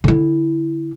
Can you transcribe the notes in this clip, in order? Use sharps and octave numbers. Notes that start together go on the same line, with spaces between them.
D3 E4